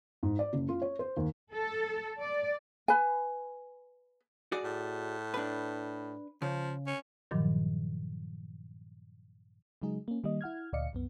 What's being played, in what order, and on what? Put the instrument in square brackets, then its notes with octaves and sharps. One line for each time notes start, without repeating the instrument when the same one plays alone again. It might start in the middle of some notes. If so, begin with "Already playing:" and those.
[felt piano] G#2
D5
F#1
F4
C#5
C5
D#2
[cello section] A4
D5
[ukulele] B4 G#5
[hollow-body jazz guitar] F#4 G#4 D5
[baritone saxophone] A2
[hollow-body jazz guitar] D4 B4
[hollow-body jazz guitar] C#3 [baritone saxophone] F3
[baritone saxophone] C#4
[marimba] G2 A#2 D#3 F3 F#3
[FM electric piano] C#3 F#3 G#3 D#4 G#4
A#3 C#4
D#3 G3 A#3 D#5
E4 F#5 F6 G#6
D2 A#2 D5 D#5 F5 C#7
C2 F#2 B3